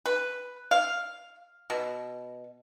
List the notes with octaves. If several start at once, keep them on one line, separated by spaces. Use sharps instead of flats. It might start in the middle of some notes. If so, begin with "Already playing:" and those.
B4
F5
B2